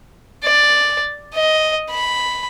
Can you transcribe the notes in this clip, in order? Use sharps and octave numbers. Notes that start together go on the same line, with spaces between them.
D5
D#5
B5